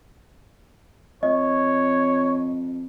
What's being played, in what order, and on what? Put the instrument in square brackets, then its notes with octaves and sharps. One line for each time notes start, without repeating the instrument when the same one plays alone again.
[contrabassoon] F2 [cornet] C#5 [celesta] D#5